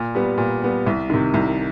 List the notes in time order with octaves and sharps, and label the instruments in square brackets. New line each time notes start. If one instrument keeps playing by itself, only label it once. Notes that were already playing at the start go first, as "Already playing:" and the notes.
Already playing: [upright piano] A#2
G3 B3
A#2
G3 B3
C2
C3 D#3
C2